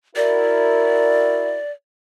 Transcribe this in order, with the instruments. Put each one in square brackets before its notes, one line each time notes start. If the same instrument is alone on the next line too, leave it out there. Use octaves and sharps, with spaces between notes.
[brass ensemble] E4 F#4 A#4 [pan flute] D5